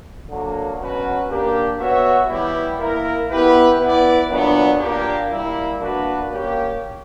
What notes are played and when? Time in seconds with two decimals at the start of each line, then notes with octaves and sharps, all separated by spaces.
0.29 D3 F#3 A#3
0.78 B2 F#3 C#4 F#4 B4
1.29 A#3 D4 G4 A#4
1.79 B3 F#4 C#5 E5
2.29 E3 G3 B3 E4 G4
2.79 A#3 E4 A#4
3.29 B3 E4 G4 B4
3.79 B3 E4 B4 D5
4.29 A#2 F#3 B3 D4
4.79 A#2 A#3 D4 G4
5.30 G3 A#3 E4
5.80 A#3 D4 F#4 B4
6.30 A#3 C#4 G4